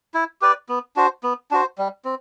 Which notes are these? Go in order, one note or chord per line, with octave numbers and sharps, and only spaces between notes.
E4
G4 B4 D5
B3
D4 F#4 C5
B3
D4 F#4 C5
G3
C4